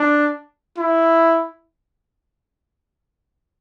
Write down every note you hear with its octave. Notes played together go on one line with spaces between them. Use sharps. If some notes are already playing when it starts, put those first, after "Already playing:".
Already playing: D4
E4